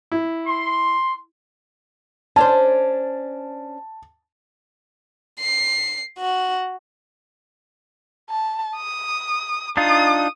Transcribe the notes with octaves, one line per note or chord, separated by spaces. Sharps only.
E4
C6
C#4 D4 C5 A5
C7
F#4
A5
D#6
D4 D#4 F4 D#6